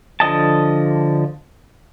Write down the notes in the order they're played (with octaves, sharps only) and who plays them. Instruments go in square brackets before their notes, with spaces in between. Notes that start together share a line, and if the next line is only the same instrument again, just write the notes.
[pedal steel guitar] D3 F3 D#5 A5